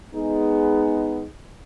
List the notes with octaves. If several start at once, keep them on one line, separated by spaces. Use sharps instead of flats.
G#3 B3 D#4 G#4